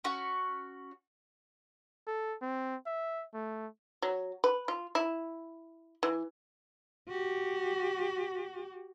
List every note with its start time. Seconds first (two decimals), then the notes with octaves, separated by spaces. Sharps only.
0.04 C#4 F#4 C#6
2.07 A4
2.42 C4
2.86 E5
3.34 A3
4.02 F#3
4.44 B4
4.68 F4
4.95 E4
6.03 E3
7.09 F#4 G4